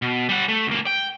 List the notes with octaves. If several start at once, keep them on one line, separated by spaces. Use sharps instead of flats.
B2
G3 F#5
A3
C#2 A#3
G5